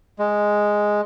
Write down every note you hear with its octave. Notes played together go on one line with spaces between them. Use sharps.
G#3